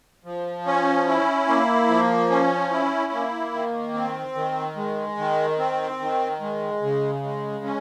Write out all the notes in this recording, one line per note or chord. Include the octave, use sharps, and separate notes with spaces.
F3
C#4
E4
A#3
F3
C#4
E4
A#3
D#3
C4
D#3
G#3
D#3
C4
D#3
G#3
C#3
G#3
C#4